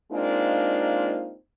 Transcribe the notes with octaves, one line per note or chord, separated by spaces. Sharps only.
G#3 A#3 C4 D4 D#4 F4